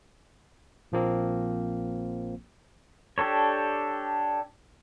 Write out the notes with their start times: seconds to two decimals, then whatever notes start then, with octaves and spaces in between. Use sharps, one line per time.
0.92 A#1 F3 A#3 C4
3.18 D4 G4 A4 C#5